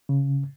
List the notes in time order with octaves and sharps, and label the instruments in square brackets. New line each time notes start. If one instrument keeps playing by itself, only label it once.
[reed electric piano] C#3